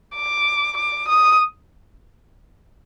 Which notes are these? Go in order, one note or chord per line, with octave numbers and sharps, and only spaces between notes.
D6
D6
D#6